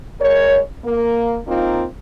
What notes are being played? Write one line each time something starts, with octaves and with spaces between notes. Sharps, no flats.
G#3 A#4 C#5
A#3
A#3 C4 D#4 F4